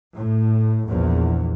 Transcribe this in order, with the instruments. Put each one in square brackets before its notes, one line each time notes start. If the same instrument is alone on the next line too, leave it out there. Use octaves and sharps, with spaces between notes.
[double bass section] A2
A#1 E2